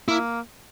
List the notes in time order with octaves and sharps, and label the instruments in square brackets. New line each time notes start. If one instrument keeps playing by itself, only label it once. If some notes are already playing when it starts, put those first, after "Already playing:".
[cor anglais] A#3 [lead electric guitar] E4